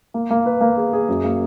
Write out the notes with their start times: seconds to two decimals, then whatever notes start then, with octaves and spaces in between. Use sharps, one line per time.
0.14 A#3
0.30 A#3
0.46 B4
0.61 A#3
0.77 G#4
0.93 G#4
1.08 F#2
1.24 A#3